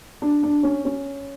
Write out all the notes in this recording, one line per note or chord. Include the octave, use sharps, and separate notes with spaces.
D4
D4
C#4
C#4